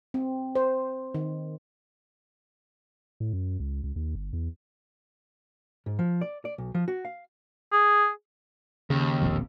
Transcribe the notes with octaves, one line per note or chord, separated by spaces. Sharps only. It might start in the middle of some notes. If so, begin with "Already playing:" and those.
C4
C5
D#3
A2
F#2
C#2
C#2
D#2
G1
E2
G#2
F3
D5
D5
B1
F3
F#4
F5
G#4
D#2 C#3
E1 A#1 F2